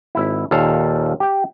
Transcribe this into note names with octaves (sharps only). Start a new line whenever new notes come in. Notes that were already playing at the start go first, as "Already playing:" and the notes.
G#1 E4
D#2 A#2 A4 F5
G4 G5